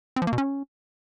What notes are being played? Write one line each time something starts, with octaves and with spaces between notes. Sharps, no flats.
C4
F3
A#3
B2
C#4